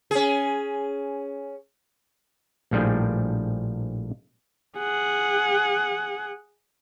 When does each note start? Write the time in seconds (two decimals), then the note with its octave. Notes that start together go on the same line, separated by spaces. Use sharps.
0.11 C#4 G#4
2.71 A#1 A2 F3 G3 D4 G#4
4.78 G#4 F#5